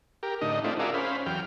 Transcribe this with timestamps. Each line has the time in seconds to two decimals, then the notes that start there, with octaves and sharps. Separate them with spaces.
0.23 G4 A#4
0.41 A2 D3 D#4 D#5
0.64 A3 C4 D4 E4 F4
0.79 F4 F#4 G#4 A#4 D5 E5
0.94 C#4 C5 F5 B5
1.26 E2 F#3 G5 F6